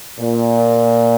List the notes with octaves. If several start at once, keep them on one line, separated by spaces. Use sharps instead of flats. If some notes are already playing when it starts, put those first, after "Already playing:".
A#2